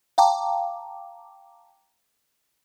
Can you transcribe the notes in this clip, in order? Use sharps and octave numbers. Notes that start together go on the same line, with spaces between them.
F5 G5 A5 A#5 D6